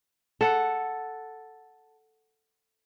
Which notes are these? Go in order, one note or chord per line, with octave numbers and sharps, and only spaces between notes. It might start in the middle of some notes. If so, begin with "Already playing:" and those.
A4 F#5